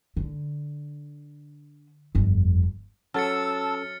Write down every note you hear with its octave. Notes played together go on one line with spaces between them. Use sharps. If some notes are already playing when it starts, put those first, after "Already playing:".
D3
G1 F2
F#3 C#4 A4 A5 E6 F6 A6 C#7